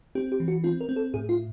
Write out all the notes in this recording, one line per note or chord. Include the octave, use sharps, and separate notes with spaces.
C4 G4
G4
E3
F#4
C4 F4
A#4
C4
A4
A2 G#4
F4